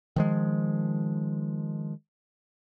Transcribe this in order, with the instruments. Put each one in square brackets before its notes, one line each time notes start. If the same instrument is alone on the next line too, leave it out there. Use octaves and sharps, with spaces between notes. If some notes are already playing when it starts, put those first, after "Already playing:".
[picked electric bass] D#3 F3 G#3